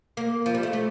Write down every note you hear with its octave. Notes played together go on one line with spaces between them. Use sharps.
A#3
F3
G3
A3
A3